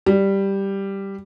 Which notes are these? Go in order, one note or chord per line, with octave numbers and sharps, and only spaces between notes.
G3